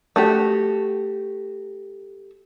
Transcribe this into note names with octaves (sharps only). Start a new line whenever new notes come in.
A3 F#4 G4